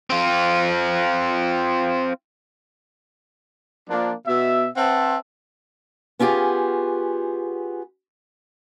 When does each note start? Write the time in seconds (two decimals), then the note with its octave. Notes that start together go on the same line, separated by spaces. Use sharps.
0.10 C4 F4
3.89 F3 A#3 D4
4.27 B2 E5
4.76 C4 B4 C5 E5 F#5 A5
6.19 B3 C#4 F4 G4 G#4